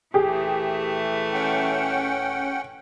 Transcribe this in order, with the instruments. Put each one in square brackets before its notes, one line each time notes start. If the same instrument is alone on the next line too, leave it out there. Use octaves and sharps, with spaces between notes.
[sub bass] D#1 [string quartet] E3 A3 [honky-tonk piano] G4 G#4
[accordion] C#4 F#5 G5